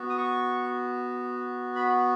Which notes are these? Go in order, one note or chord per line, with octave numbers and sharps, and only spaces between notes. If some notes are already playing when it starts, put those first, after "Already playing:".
Already playing: B3 F#4
D#6
C#6
B5